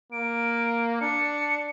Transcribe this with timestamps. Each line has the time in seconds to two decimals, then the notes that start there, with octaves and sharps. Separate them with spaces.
0.12 A#3 D7
1.01 D4 C#7